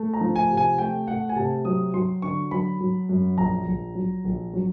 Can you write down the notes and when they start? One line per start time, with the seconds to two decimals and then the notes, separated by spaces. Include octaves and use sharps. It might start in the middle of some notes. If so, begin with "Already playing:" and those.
Already playing: A3
0.14 A#5
0.21 F3
0.36 G#5
0.50 C3
0.57 G#5
0.78 A3 G5
1.07 A3 F#5
1.29 G#5
1.36 C3 A5
1.65 F#3 D#6
1.94 F#3 C6
2.22 D3 C#6
2.51 F#3 B5
2.81 F#3
3.09 F#2
3.38 A#1 A#5
3.66 A#1
3.95 F#3
4.24 A#1
4.54 F#3